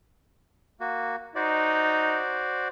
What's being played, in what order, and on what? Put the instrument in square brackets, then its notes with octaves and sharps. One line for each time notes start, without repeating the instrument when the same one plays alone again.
[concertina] A#3 F#4
[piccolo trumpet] D#4 [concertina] F#4 C5 D5